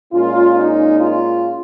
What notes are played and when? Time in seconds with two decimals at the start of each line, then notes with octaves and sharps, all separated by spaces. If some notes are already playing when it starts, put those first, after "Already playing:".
0.12 A#2 G#3 C#4 F4
0.57 D#4
1.01 F4